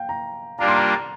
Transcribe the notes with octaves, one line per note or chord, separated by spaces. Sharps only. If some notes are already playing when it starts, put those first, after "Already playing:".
Already playing: F5 G5
A#5
G3 A#3 D4 F4 A#5
C6
A#5